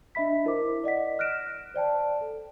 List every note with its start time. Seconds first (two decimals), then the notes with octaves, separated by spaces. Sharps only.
0.15 D4 D#5 E5 B5 B6
0.45 E4 A#4 C5 E5 D6
0.84 D5 D#5 F#5 B6
1.19 F6 F#6 A#6 D7 E7
1.74 C5 D5 G5 A5
2.21 A4